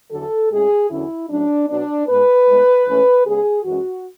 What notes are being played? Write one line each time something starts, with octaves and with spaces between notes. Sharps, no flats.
E2 D3 F#3 A4
A2 G#3 C#4 G#4
E2 D3 F#3 C#4 E4
A2 F#3 C#4 D4
B2 F#3 B3 D4
G#2 G#3 B3 B4
A2 G#3 B3
G#2 E3 A3 C#4
C#3 G#3 B3 G#4
F#2 E3 G#3 C#4 F#4